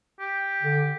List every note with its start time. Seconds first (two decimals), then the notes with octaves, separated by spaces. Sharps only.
0.20 G4
0.63 D3